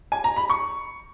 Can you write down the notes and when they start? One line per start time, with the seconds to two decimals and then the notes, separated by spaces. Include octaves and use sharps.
0.12 G#5
0.24 A#5
0.36 B5
0.50 C#6